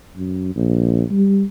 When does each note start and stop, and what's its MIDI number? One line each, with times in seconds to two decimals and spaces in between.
0.17 0.54 42
0.55 1.03 34
1.11 1.43 55